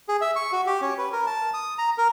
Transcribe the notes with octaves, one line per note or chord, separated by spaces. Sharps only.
G#4
E5
C#6
F#4
G4
C#4
B4
A#4
A5
D#6
A#5
A#4